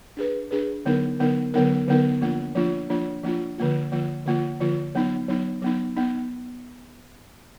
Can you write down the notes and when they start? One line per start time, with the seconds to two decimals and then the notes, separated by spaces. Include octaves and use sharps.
0.17 D4 G#4 B4
0.51 D4 G#4 B4
0.85 D3 F#3 B3 D#4 A#4
1.19 D3 F#3 B3 D#4 A#4
1.54 D3 F#3 B3 D#4 A#4
1.88 D3 F#3 B3 D#4 A#4
2.21 F3 A#3 D4 F4
2.55 F3 A#3 D4 F4
2.90 F3 A#3 D4 F4
3.24 F3 A#3 D4 F4
3.58 D3 F3 A#3 F4
3.92 D3 F3 A#3 F4
4.26 D3 F3 A#3 F4
4.61 D3 F3 A#3 F4
4.95 F#3 B3 D#4
5.28 F#3 B3 D#4
5.62 F#3 B3 D#4
5.97 B3 D#4